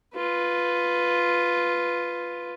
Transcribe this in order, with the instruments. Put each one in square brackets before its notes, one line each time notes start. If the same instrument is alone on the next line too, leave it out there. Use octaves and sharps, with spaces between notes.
[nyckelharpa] F4 B4